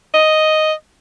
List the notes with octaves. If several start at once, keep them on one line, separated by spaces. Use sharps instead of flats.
D#5